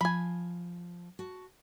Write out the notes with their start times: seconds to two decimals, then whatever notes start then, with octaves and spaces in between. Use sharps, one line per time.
0.01 F3 G#5 B5
1.19 F#4 A5